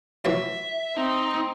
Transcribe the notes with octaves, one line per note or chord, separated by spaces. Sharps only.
E3 F#3 F4 E5
C4 D#4